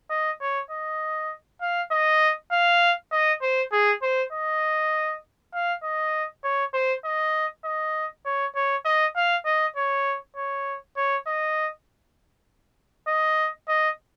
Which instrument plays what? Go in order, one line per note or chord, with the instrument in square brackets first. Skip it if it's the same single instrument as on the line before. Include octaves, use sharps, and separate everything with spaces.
[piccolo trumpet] D#5
C#5
D#5
F5
D#5
F5
D#5
C5
G#4
C5
D#5
F5
D#5
C#5
C5
D#5
D#5
C#5
C#5
D#5
F5
D#5
C#5
C#5
C#5
D#5
D#5
D#5